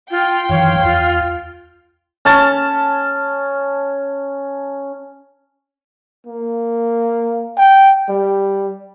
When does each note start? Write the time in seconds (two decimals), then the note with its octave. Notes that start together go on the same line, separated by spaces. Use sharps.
0.11 F4 G5 C6
0.49 F#2 D#3 E3 C#5 F5
0.84 E2 F4
2.25 C#4 A5
6.26 A#3
7.57 G5
8.09 G3